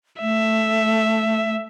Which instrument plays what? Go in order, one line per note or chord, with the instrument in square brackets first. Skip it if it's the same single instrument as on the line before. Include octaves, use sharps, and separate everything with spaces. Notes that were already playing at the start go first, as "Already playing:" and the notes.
[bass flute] A3 [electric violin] E5